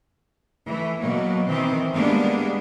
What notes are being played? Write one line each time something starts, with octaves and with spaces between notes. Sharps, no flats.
E3 A3
B2 F#3 A#3
D#3 E3 C4
G3 G#3 A#3 B3 D4